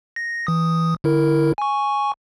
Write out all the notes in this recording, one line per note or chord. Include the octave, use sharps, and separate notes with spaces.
A#6
E3 D#6
D3 E4 A#4
G#5 C#6